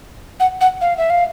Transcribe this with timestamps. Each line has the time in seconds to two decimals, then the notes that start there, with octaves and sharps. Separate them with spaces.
0.40 F#5
0.61 F#5
0.81 F5
0.98 E5
1.10 F5